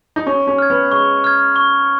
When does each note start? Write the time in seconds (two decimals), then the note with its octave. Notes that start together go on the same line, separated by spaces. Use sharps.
0.16 D#4
0.27 C#4 C#6
0.47 C#4
0.58 F6 G#6
0.70 B3
0.91 G#3 C#6
1.24 F6 G#6
1.56 C#6